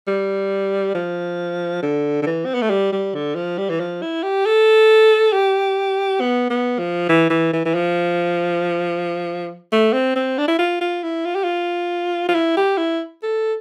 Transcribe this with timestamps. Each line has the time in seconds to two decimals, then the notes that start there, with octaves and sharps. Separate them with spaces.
0.07 G3
0.95 F3
1.83 D3
2.22 D3
2.26 E3
2.46 C4
2.54 B3
2.62 A3
2.70 G3
2.92 G3
3.14 D3
3.35 F3
3.58 G3
3.69 E3
3.80 F3
4.02 E4
4.23 G4
4.46 A4
5.32 G4
6.20 B3
6.50 B3
6.79 F3
7.09 E3
7.30 E3
7.53 E3
7.65 E3
7.74 F3
9.72 A3
9.93 C4
10.15 C4
10.38 D4
10.48 E4
10.58 F4
10.81 F4
11.03 E4
11.25 F4
11.35 G4
11.44 F4
12.28 F4
12.35 E4
12.57 G4
12.78 E4
13.23 A4